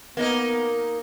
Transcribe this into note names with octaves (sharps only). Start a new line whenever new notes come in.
A#3 B3 D#4 A#4